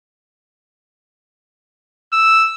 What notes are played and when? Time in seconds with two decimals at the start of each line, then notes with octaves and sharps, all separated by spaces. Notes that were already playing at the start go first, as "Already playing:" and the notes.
2.13 E6